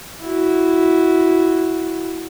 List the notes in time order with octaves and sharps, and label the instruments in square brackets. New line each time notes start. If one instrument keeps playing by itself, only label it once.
[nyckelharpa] E4 F#4